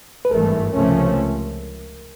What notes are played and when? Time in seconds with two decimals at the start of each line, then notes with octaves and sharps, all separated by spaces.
0.25 B4
0.30 G#1 G2 E3 A3 A#4
0.74 C#2 C3 F3 A3 C#4